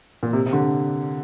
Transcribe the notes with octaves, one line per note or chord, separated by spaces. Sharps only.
A#2
C3
C3
D3